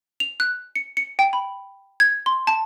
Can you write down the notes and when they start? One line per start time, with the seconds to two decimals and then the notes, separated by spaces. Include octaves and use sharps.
0.20 F7
0.40 F#6
0.76 C#7
0.97 C#7
1.19 G5
1.33 B5
2.00 G#6
2.26 C6
2.47 A5